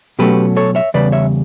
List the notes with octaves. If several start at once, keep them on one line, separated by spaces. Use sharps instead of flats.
B2 F#3 A3 C#4 G4 B4
A4 C#5
C#5 E5
E2 C#3 G3 B4 D5
C#5 E5